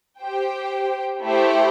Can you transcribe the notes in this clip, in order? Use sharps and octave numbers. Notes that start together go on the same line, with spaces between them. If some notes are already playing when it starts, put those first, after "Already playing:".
G4 C5 G5
A3 E4 G4 C5